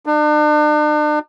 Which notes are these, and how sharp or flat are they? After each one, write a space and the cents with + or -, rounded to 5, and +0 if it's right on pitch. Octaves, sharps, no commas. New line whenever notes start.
D4 +40